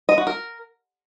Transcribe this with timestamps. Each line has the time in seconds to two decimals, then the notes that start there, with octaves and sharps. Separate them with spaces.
0.09 D#5
0.18 F#4
0.27 A#4